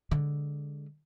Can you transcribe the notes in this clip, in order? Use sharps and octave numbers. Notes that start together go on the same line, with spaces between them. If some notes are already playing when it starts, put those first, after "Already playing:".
D3 G#3